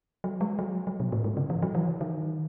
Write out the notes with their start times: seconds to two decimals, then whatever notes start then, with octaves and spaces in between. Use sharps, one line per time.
0.24 F#3
0.41 G#3
0.59 F#3
0.87 F#3
1.00 B2
1.12 A2
1.24 G#2
1.37 C#3
1.50 E3
1.62 F#3
1.75 E3
2.01 D#3